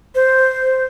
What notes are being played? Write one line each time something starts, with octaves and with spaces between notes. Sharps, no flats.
C5